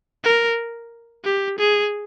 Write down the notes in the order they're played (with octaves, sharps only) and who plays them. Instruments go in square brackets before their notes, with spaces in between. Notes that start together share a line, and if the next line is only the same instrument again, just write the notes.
[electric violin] A#4
G4
G#4